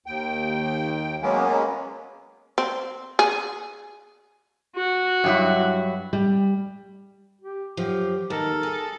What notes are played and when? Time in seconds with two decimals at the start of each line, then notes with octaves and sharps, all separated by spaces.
0.06 D#2 G5
1.22 F#3 G#3 A#3 B3 C#4
2.58 C4
3.19 G#4
4.76 F#4
5.24 G2 F#3 E4
6.13 G3
7.41 G4
7.77 F#2 F3 G4
8.30 D#2 A4 A#4
8.63 G#4